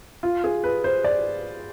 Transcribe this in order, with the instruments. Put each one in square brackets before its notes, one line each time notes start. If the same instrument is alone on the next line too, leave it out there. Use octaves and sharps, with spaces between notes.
[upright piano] F4
G#4
B4
C5
D5